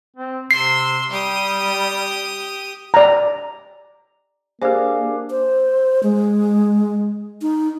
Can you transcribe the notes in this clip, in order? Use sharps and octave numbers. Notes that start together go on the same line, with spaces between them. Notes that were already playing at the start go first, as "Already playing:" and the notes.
C4
C3 C6 E6 C7
G3 G4 D#6
D5 A#5
A#3 D4 G4 G#4 C5 D#5 F5
C5
G#3
D#4